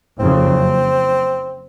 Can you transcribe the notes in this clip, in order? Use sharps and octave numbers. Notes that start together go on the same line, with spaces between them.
F#1 F2 C#3 C4